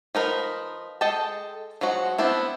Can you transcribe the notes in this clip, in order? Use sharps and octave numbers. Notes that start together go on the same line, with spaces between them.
F3 D#4 A#4 B4
G#3 A4 D#5 G5 A5
F3 F#3 G#3 F#4
B3 C4 D4 E4